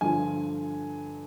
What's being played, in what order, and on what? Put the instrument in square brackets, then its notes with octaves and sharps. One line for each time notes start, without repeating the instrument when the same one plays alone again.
[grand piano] G2 D3 F3 G#5